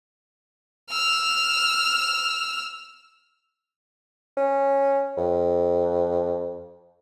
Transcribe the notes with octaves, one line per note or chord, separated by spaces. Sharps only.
E6 F6
C#4
F2